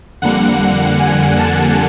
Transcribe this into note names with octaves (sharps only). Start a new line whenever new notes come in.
F2 D3 G3 A#3 F#5
G#5
A5